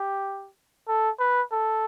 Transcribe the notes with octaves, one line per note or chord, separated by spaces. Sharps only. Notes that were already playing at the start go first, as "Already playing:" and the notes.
Already playing: G4
A4
B4
A4